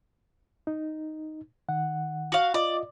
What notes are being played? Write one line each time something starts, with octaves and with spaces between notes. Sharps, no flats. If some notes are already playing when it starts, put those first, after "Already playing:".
D#4
D#3 F#5
F#4 F5
F4 D5 D#5